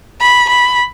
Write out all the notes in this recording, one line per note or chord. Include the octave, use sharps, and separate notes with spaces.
B5
B5